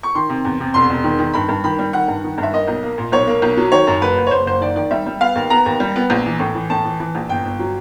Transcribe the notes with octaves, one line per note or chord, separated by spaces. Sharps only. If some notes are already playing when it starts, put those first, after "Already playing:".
C#6
D#3 C6
C3
E2
C3
E1 C6
E1
D#3
D#3
G2 B5
G2
D#3 B5
G3
D#3 F#5
G2
D#3
G2
E5
A#3 D#5
B1
A#3
A#2
B1 C#5
A#3
B1
F#3
D#3 C#5
F#2
F#1 B4
F#1
C#5
F#1 C5
F#1 C5
D#3 D5
D#3 D5
G3 E5
G3
B3 F5
D#2
B3 A#5
D#2
G3
B3
A#1
E3
A2
E3
A2 A5
E3
E3
A#1
G1 G5
G1
F#3